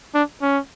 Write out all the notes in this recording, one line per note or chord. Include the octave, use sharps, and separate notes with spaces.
D4
C#4